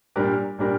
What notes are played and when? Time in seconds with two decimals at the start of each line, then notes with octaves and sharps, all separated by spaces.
0.16 A#2 G3 D4 G4 A#4
0.58 A#2 G3 D4 G4 A#4